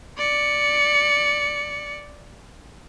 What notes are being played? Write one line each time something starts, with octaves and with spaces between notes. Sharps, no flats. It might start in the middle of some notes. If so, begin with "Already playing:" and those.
D5 C#7